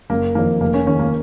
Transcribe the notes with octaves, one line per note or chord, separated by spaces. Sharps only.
F#1 A#3
F2 D#3 A#3
F1 A#3
C#4
D#2 D#3 C#4
A#3